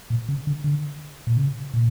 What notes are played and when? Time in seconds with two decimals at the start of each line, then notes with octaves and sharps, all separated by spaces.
0.10 A#2
0.29 C#3
0.47 D3
0.64 D3
1.27 A#2
1.37 C#3
1.74 A#2